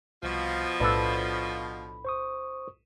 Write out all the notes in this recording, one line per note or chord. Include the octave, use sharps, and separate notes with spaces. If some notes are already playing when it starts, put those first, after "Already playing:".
C2 B2 F3
B1 A2 D4 E4 A4 B4 B5
C5 C#6 D#6